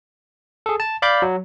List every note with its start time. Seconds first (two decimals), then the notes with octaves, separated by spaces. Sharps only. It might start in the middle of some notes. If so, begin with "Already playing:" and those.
0.66 G#4 A4
0.80 A5
1.02 D5 F5 B5 D6 G6
1.22 F#3